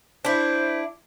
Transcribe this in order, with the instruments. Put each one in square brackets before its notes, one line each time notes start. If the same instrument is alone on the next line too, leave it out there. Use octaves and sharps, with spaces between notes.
[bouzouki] D4 E4 [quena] C5